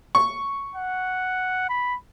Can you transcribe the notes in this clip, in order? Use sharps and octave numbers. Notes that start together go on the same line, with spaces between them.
C#6
F#5
B5